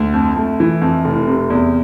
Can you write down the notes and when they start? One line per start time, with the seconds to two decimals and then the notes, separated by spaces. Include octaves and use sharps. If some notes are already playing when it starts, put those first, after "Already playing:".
Already playing: D2
0.14 F2
0.37 A3
0.60 E3
0.82 F2
1.04 F1
1.28 C3
1.50 E2